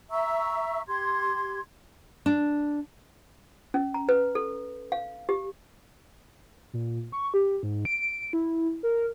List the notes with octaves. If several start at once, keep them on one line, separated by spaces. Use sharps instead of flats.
E5 A#5 C#6 E6
G4 C6 G#6
D4
C#4
A#5
B4
A4
F5
G4
A#2
C#6
G4
G#2
D7
E4
A#4